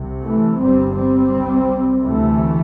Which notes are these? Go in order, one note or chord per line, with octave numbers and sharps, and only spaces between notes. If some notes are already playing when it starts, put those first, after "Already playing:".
Already playing: C2 C3
E3 A3
G1 G2 G3 C4
G3 C4
C2 C3
D2 C3 E3 A3